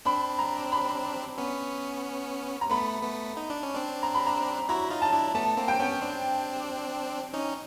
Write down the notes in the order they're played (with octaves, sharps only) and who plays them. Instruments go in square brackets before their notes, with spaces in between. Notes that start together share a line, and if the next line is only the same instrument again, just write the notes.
[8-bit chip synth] C4 D4 [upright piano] B5
[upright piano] A#5
B5
[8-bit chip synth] B3 C#4
[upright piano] A#5
[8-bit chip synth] A3 B3 [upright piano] B5
[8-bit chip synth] A3 B3
D#4
D4
C#4
C4 D4
[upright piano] A#5
B5
A#5
[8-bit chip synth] E4 F#4 [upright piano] A#5
[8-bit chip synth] D#4 F4
[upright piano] A5
[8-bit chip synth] D4 E4
[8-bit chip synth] A3 B3 [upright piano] A5
[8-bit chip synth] A#3 C4
[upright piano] G5
[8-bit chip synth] B3 C#4
C4 D4
C#4 D#4